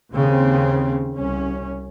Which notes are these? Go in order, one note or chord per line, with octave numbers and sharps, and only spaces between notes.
D#2 C#3 C4
C2 C#4